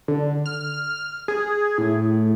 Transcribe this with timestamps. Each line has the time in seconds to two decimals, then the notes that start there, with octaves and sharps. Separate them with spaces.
0.08 D3
0.46 F6
1.28 G#4
1.78 A2